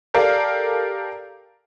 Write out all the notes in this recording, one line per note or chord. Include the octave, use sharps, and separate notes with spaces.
G4 A4 A#4 D5 F5